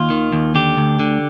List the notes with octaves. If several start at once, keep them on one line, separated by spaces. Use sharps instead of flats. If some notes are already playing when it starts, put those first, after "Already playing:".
Already playing: D#2 F4
D#3
D#2
D3 G4
D2
D3